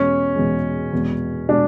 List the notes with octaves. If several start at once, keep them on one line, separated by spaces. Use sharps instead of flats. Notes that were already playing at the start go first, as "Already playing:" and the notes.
Already playing: E2 B2 G#3 C#4
E2 B2 G#3
E2 B2 G#3
B2 G#3 D4